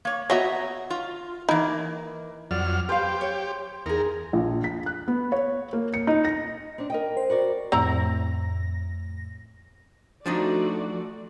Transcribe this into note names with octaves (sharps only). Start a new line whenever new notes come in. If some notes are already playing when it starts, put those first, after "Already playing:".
A#3 C#5
B3 F#4 C#5 D#5 E5 A#5
F4
E3 A#3 D#4 E4
F2 F#3 D5 F6
G4 B4 C5 F5
C#5
E2 D#4 G#4 A#4
A#1
B6
F#6
B3
C#5
A#3
C#7
D#4
A#6
C4 D4
A#4 D#5 G5
C5
F#4 A#4 D5
F2 A2 C4 E4 A#5 A#6
F3 A3 D4 D#4 F#4 D5